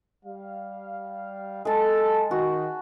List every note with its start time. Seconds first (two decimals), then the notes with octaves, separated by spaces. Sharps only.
0.25 G3 F5
1.65 G#3 A4 A5
2.31 D#3 F#4